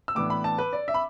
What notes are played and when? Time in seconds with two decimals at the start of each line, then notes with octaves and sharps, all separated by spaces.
0.08 E6
0.15 A2 E3 B3 D4 D6
0.30 B5
0.44 A5
0.58 B4
0.73 D5
0.88 E5
0.94 B5